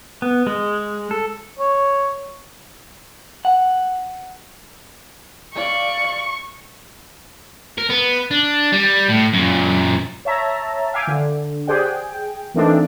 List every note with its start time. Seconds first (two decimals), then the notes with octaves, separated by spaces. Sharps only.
0.22 B3
0.47 G#3
1.11 A4
1.59 C#5
3.45 F#5
5.56 D5 F5 C#6
7.78 A#4
7.90 B3
8.31 D4
8.72 G3
9.08 A2
9.33 F#2 A#2
10.25 C#5 E5 A5 A#5
10.93 E5 F5 G5 G#5 D6
11.07 D3
11.67 G4 G#4 C5 D5 F#5 G5
11.79 G#4 G5
12.54 E3 A3 A#3 C4 D4 D#4